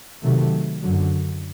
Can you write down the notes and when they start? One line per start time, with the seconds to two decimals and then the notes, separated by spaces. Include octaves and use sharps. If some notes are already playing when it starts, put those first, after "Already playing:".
0.23 C3 D#3 F#3 A3
0.81 F#2 D3 F#3